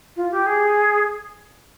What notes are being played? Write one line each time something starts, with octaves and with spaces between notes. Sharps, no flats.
F4
G4
G#4